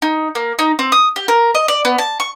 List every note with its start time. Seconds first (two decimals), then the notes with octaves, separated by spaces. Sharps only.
0.02 D#4
0.35 A#3
0.59 D#4
0.79 C4
0.92 D#6
1.16 G4
1.28 A#4
1.55 D#5
1.68 D5
1.85 B3
1.98 A5
2.20 C#6